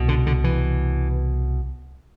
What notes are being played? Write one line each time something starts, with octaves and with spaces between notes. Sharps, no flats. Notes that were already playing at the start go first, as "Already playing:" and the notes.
Already playing: C2 B2
D3
D3
E3